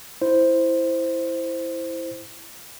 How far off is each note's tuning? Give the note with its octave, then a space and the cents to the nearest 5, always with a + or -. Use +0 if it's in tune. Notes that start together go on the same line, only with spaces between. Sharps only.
E4 +0 C5 +0